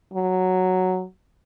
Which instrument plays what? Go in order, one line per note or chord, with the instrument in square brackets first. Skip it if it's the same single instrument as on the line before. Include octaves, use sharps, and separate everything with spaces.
[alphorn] F#3